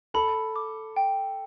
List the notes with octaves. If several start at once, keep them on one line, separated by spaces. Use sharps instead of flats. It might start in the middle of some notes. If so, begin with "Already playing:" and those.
A4 B5
D6
G5